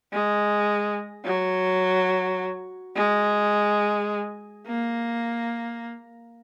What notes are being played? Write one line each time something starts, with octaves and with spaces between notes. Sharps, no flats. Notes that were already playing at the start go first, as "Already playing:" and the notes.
G#3
F#3
G#3
A#3